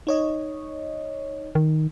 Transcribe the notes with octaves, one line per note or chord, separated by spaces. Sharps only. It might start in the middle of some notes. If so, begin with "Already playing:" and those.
D#4 C#5 D#5
D#3